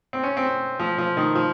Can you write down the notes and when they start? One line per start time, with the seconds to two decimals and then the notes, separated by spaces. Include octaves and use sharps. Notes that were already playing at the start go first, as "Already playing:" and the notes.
0.13 C4
0.23 C#4
0.37 C4
0.79 F3
0.98 F3
1.17 D#3
1.35 F3